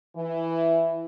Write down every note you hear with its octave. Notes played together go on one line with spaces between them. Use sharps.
E3